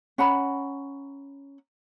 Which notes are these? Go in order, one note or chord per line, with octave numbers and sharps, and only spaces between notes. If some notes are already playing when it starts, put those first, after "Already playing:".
C#4 F#5 A#5 B5